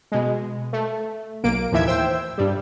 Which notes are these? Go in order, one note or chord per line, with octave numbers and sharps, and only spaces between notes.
B2 G#3
A3
B1 A#3 D7
D#2 A2 E3 F3 E5 G#6
C5 G5 E6
G2 G3